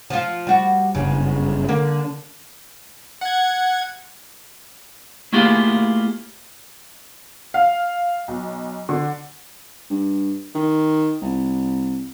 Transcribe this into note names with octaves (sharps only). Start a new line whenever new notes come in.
F3 F4
G3 F#4
F#1 G2 C#3
D3 A#3
F#5 G#6
A3 A#3 E4 F4 G4 G#4
F5
B1
D3
G2
D#3
C2